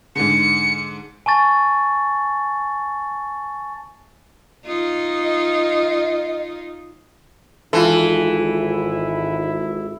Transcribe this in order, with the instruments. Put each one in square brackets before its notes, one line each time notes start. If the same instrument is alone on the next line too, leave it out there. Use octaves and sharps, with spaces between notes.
[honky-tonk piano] G#2 D3 [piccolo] C#7
[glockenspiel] G#5 A5 C#6 A6
[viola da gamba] D#4 F4
[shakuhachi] D#5
[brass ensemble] G#1 G#2 E4 [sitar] E3 [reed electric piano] F4 A4